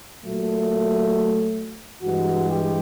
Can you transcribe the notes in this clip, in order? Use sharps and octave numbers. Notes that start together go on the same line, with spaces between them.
A#2 F#3 A3
G2 E3 G#3 F#4
G4